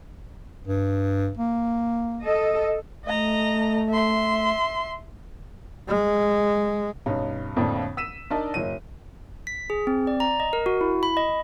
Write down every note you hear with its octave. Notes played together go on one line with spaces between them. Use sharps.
G2
A#3
A4 D#5
A3 D#5 A#5
E5 C6
G#3
B1 G2 C#4 D#4
F2 A2 D3 F3 A#3 D4
E6 B6 D#7 E7
D4 D#4 A#4 D5 D#5 A5
F#1 F#3 D#7
B6
G#4
C4
D5
A#5
D#5
A#4
F#4
E4
B5
D#5